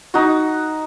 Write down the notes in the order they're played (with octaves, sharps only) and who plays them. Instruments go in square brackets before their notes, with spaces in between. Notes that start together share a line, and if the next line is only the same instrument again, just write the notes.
[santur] D#4 F#4